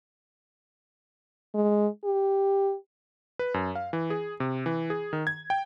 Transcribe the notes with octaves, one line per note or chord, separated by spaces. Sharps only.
G#3
G4
B4
F#2
F5
E3
G#4
C3
E3
G#4
D#3
G#6
G5